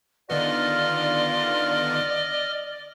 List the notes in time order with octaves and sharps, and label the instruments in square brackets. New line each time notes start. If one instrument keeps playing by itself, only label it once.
[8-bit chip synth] D3 D#3 B3 [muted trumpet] F4 [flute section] D5 [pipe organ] D#5 F6